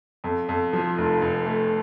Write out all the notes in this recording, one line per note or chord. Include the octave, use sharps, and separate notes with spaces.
F2
F2
F3
F1
F1
A3